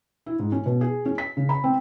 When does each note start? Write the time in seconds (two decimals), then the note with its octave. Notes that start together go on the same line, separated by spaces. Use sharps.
0.26 E4
0.39 G#2
0.52 C#4
0.66 B2
0.81 G#4
1.06 C#4
1.18 B6
1.37 C#3
1.49 B5
1.64 C4